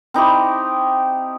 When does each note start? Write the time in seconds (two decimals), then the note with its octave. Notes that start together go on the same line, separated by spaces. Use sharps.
0.14 C4 D#4 E4 G4